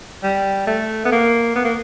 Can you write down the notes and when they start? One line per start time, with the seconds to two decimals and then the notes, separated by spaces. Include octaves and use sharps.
0.23 G3
0.67 A3
1.05 B3
1.12 A#3
1.56 B3
1.65 A#3